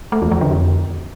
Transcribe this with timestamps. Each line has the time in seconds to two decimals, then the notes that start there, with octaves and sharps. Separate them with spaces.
0.12 A3
0.22 E2
0.31 F3
0.41 D3
0.51 F2